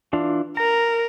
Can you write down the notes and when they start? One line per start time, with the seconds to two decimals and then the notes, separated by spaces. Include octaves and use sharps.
0.13 E3 D4 F4
0.57 A#4 A#5